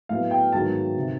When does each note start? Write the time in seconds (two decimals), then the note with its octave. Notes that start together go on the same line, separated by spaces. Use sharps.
0.09 A2 F#3 B3 F5
0.31 G5
0.52 G#2 D#3 F#3 B3 A5
0.97 C3 D#3